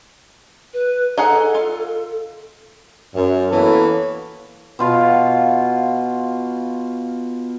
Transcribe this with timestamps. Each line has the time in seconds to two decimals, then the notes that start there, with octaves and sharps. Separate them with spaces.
0.74 B4
1.18 D#4 G#4 A4 F#5
1.55 F4
3.14 F#2
3.50 E3 A#3 B3 A4 B4 C#5
4.79 B2 F4 F5